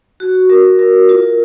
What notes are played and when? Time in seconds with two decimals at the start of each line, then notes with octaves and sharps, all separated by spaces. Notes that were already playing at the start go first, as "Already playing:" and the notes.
0.20 F#4
0.50 A#4
0.79 A#4
1.09 F4